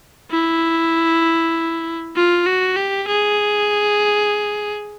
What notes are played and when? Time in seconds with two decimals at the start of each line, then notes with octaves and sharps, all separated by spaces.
0.31 E4
2.16 F4
2.46 F#4
2.76 G4
3.08 G#4